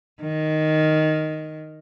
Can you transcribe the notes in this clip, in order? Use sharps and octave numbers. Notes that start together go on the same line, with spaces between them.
D#3